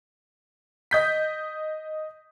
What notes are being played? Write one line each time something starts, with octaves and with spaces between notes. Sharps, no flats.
D#5 G6 B6